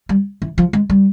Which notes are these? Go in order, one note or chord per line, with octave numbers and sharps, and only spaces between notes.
G3
E3
F3
G#3
G3